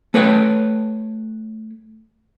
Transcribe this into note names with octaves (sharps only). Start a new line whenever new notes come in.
A3 A4 B4 C#5 F#5 G5